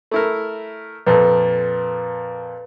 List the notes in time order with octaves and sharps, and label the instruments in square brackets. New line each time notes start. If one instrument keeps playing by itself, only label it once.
[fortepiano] A3 E4 A#4
[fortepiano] F2 A#2 A4 [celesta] B4